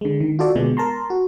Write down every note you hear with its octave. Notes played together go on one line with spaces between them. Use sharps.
D3 G#3
D#3
F4 F#4 A4 D5
B2 D3 G#3
A#4 A5 A#5 C6
F#4